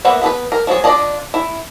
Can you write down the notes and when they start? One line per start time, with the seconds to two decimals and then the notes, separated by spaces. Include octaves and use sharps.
0.05 A#3 B3 B4 E5 F#5
0.22 B3 A4 B4
0.52 A#4
0.67 F3 F#3 G#4 C#5
0.84 D4 F4 D5 D#5 A5
1.34 E4